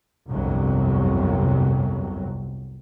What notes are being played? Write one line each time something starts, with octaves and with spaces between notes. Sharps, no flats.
G1 C2 F2 C3 F#3